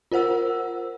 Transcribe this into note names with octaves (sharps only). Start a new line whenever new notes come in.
F4 A#4 C5 F#5 E6